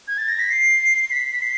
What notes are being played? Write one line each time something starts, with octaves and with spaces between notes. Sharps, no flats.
G#6
A6
A#6
B6
C7
B6
C7